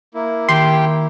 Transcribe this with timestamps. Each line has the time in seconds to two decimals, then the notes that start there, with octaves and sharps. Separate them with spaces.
0.14 A#3 E4
0.49 D#3 G4 G5 C6